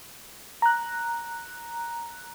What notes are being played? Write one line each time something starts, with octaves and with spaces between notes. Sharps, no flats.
A#5 F#6